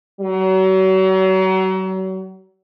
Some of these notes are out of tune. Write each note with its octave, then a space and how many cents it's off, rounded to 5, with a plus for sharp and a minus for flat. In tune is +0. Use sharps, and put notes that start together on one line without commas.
F#3 +35